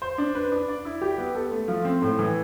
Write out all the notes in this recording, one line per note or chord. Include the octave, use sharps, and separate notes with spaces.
C5
D4
B4
D4
D5
E4
G4
B3
A4
A3
F3
C4
A2
E3